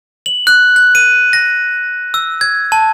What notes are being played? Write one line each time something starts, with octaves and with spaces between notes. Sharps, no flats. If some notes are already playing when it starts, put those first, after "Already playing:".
F#7
F#6
F#6
D#7
A#6
E6
G#6
A5